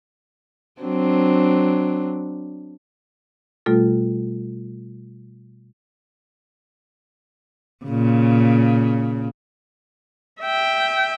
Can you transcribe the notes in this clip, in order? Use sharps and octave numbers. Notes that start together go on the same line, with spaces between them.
F#3 C4 D4
B2 G3 A3 F4 A4
A#2 C#3
E5 G5